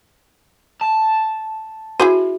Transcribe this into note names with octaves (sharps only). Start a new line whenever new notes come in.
A5
E4 F#4 G#4 C5